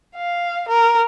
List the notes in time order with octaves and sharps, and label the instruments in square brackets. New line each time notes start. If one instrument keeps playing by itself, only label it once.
[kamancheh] F5
A#4